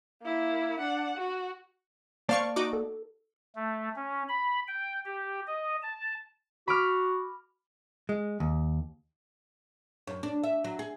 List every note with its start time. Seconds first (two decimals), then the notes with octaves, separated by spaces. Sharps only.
0.22 A#3 E4
0.79 D4 F#5
1.17 F#4
2.29 A#3 C5 D5 F5 A5 C#6
2.56 D#4 F#4 D6
2.73 A4
3.56 A3
3.96 C#4
4.28 B5
4.68 G5
5.05 G4
5.47 D#5
5.83 A5
6.68 F#4 B5 D6 F6
8.09 G#3
8.40 D#2
10.07 F#2
10.23 D4
10.44 E5
10.64 F#3
10.79 G#4